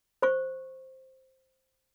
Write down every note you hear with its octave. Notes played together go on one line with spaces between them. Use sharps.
C5 C#6